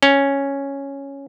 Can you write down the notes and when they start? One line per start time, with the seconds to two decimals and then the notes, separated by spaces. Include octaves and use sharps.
0.03 C#4